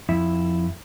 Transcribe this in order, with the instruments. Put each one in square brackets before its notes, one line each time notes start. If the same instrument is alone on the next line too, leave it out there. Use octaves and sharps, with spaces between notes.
[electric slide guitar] F2 E4